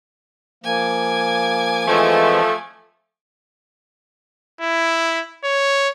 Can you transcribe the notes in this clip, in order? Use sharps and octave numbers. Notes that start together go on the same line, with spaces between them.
F3 A#3 G#5 D6
E3 F3 G#3 A3 C4
E4
C#5